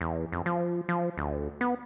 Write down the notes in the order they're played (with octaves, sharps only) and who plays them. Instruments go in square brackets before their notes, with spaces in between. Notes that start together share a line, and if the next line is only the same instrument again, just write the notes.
[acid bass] E2
F2
F3
F3
D2
B3